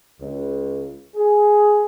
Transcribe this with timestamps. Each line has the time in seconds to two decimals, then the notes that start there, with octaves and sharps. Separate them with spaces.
0.21 C#2
1.16 G#4